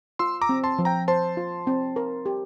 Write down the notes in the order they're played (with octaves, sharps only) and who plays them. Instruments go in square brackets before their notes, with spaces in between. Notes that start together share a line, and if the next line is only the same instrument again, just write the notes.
[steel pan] F4 [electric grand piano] C6 E6
[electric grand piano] A#5 D6
[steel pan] C4
[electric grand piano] A5 C6
[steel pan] F3
[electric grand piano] G5 A#5
[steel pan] C5 [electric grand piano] A5 C6
[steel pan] F4
C4
A#4
G4